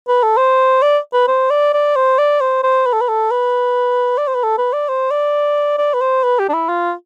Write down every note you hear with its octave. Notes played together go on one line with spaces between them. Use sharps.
B4
A4
C5
D5
B4
C5
D5
D5
C5
D5
C5
C5
B4
A4
B4
A4
B4
D5
C5
B4
A4
B4
D5
C5
D5
D5
B4
C5
B4
G4
D4
E4
F4